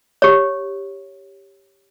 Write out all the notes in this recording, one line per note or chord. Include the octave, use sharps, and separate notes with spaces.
G4 C#5